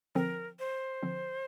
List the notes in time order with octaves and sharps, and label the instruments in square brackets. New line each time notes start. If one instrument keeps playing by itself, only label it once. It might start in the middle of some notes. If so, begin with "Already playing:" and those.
[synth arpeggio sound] D3 F3 C4 [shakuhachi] A#4
[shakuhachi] C5
[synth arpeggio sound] D3 F3 C4